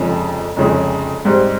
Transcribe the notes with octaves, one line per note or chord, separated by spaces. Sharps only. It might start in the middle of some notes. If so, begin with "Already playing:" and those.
Already playing: F1 F2 C#3 G#3 C#4
F1 F2 C#3 G#3 C#4
G#2 G3 C4